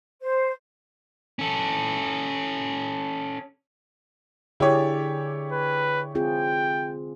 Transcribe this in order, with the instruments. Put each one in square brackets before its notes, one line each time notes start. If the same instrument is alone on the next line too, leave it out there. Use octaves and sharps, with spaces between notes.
[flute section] C5
[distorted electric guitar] C#4 A4
[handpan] D3 G#4 D5 [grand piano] E4 G4 C#5
[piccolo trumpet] B4
[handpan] C4 F4 G#4 [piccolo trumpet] G5